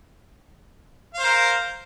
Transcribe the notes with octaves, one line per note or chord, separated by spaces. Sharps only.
A#4 C5 F5